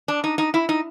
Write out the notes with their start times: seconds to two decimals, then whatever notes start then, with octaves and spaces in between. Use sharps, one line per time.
0.08 D4
0.24 D#4
0.38 D#4
0.54 E4
0.69 D#4